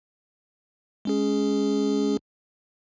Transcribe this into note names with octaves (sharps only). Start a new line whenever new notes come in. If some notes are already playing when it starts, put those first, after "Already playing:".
G#3 C#4 G#4